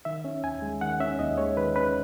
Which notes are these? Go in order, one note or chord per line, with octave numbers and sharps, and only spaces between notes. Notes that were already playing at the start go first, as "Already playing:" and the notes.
D#3 E5
C#4
D#2 G#5
G#3
D#3 F#5
C#4 E5
D#2 D#5
G#3 C#5
D#3 B4
C#4 B4